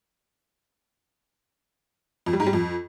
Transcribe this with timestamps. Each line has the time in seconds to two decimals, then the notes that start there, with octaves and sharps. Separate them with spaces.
2.26 F2
2.33 G3
2.40 G#2
2.46 G3
2.53 F2